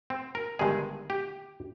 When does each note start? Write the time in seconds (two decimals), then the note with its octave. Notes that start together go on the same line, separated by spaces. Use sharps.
0.10 C4
0.35 A#4
0.59 G1 G2 D#3 G#3 G#4
1.10 G4